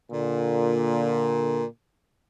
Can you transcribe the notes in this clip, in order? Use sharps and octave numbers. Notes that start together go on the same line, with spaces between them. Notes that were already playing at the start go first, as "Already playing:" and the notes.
A#2 D3